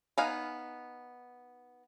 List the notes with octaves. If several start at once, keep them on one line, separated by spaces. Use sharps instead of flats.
B3 D#4 F5 G#5